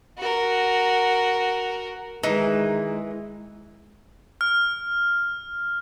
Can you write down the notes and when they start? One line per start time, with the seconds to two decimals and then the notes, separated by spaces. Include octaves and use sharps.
0.18 F#4 A#4
2.23 D#3 E3 G#3 D#4 G#4
4.41 F6